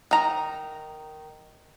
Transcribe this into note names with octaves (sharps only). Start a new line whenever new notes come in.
D#3 A#5